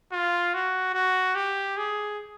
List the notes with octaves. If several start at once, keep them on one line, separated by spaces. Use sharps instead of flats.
F4
F#4
F#4
G4
G#4